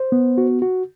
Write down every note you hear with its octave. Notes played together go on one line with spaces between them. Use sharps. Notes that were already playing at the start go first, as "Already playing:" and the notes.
Already playing: C5
B3
F#4
F#4